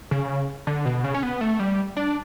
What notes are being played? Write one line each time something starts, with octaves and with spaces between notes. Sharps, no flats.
C#3
D3
B2
C#3
C#4
B3
A3
G3
D4